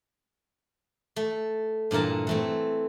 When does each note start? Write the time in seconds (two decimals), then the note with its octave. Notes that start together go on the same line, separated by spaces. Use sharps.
1.16 A3
1.91 G2 A#2 E3 A#4 A5
2.27 E3 A3 C4